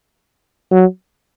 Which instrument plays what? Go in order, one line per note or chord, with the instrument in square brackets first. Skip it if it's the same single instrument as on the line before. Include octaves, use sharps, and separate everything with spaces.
[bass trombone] F#3